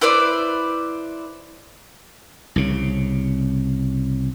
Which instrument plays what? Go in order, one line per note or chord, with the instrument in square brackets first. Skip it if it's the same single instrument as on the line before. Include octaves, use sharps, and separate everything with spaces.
[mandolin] E4 B4 C5 D5
[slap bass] C2 C#3